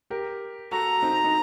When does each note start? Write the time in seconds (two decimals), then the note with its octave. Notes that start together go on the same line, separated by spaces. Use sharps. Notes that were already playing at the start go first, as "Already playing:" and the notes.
0.10 G4 A#4
0.72 F#4 A4 A#5
1.02 C4 D#4
1.24 D#4